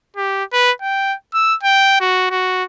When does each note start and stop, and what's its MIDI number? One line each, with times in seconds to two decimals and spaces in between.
0.17 0.44 67
0.53 0.71 71
0.82 1.15 79
1.33 1.55 88
1.63 1.95 79
2.00 2.26 66
2.31 2.64 66